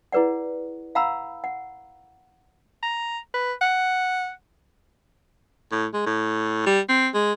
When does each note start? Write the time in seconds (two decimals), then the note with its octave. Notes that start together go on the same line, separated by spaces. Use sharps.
0.12 E4 G#4 B4 D5 F#5
0.95 F5 F#5 A#5 B5 E6
1.44 F#5
2.83 A#5
3.34 B4
3.62 F#5
5.72 A2
5.94 G#3
6.06 A2
6.66 G3
6.89 C4
7.14 G#3